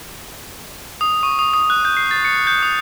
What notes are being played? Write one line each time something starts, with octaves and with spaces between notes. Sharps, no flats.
D#6
C#6
D#6
D#6
F#6
G6
C7
A6
C#7
G6
D#6